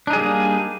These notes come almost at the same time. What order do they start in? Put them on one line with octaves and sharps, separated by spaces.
D4 D#4 G#4 G3 A#3